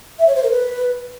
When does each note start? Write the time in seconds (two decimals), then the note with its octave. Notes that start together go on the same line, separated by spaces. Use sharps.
0.19 E5
0.27 C#5
0.35 C5
0.43 A#4
0.52 B4